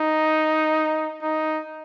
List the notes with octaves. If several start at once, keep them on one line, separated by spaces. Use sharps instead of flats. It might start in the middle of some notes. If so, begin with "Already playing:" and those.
Already playing: D#4
D#4